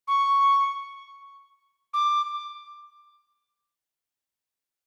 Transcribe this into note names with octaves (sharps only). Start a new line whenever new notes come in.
C#6
D6